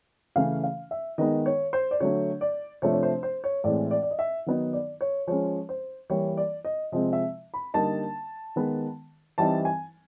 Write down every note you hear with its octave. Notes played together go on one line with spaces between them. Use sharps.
C#3 E3 A3 C#4 F5
F5
E5
D#3 G#3 B3 D#4 D#5
C#5
C5
D5
D3 F#3 A3 C#5
D5
C3 F3 A3 D4 C#5
C#5
C5
C5
C#5
A2 E3 G#3 C4 D5
D5
D5
D#5
E5
D#3 F#3 B3 D#4
D5
C#5
F3 G#3 C#4 C#5
C5
E3 G3 A#3 C#5
D5
D#5
C3 F3 G#3 C4 D#5
E5
B5
D3 G3 A#3 D#4 A5
D#3 G#3 B3
E3 G3 C4 D#4 A5
G#5